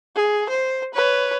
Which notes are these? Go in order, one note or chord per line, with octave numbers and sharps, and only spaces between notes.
G#4
C5
B4 C#5